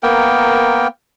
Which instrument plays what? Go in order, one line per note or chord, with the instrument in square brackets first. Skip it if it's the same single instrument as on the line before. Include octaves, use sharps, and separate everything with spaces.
[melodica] A#3 B3 A#4 G5